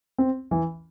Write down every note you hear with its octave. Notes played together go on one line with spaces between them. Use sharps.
C4
E3